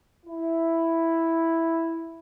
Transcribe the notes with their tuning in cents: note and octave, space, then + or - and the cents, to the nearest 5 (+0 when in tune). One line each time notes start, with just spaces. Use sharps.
E4 +0